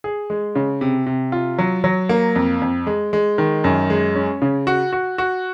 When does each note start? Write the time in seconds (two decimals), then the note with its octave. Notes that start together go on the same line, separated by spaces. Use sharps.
0.04 G#4
0.30 G#3
0.55 C#3
0.81 C3
1.06 C3
1.32 F4
1.59 F#3
1.84 F#3
2.09 A#3
2.35 F2
2.61 F2
2.87 G#3
3.13 G#3
3.38 D#3
3.64 F#2
3.90 G#3
4.15 C#4
4.42 C#3
4.67 F#4
4.93 F#4
5.18 F#4